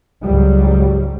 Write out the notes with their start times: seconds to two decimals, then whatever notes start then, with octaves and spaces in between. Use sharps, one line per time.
0.24 C#2 G#2 F#3 G3